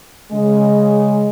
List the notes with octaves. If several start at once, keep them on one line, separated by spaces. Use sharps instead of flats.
C#3 G#3